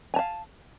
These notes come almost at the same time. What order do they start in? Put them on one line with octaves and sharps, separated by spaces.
G#5 A5 F5